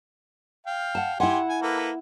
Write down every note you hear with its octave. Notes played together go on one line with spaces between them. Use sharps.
F5 G5
F#5 A5
E4 G4 F#5 G#5 C6
G#5
A#3 A4 B4